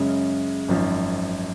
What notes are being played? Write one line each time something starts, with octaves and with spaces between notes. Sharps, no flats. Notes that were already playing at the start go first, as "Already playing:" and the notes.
Already playing: F#2 C#3 G#3 C#4
G#1 F#2 F3